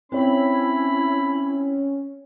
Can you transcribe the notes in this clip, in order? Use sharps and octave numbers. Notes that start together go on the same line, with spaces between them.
C4 C#4 E4 C#5 B5